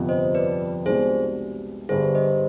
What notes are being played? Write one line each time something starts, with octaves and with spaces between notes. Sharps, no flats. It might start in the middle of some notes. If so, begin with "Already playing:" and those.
Already playing: G1 F2 C3 F3 B3
C5 D#5
B4 D5
C2 B2 G#3 D4 G4 G#4 C5
G1 G2 D3 G3 G#4 C5
C5 D#5